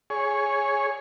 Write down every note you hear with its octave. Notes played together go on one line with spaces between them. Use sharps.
G#4 C#5